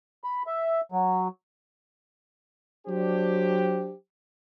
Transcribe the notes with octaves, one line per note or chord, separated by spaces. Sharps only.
B5
E5
F#3
F#3 D4 G4 C5